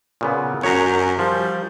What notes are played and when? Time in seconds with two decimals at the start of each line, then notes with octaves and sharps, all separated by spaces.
0.21 A#2 C#3 B3
0.63 F#2 C#5 A#5
1.19 F3 G3